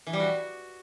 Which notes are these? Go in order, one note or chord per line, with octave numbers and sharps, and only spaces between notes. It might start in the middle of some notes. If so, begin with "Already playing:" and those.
E3
G3
F#4